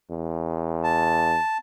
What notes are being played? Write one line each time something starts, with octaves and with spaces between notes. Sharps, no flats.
E2
A5